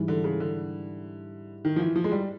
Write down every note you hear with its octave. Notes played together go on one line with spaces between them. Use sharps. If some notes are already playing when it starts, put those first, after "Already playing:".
Already playing: G#2 E3 G3
D3
C#3
D3
D#3
F3
E3
F3
G#3
G3